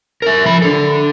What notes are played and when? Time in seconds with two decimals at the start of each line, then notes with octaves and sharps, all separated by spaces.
0.22 A#4 E5
0.46 F3 B5
0.62 D4 A4